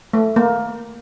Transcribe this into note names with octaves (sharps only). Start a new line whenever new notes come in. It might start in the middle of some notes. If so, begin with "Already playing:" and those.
A3
A#3